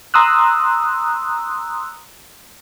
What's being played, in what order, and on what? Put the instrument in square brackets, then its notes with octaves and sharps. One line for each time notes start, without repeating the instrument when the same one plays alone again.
[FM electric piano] A#5 C6 D#6 E6 F#6